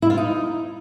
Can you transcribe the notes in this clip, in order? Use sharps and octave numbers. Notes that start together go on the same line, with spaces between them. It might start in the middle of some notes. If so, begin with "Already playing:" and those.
E4
F4
D#4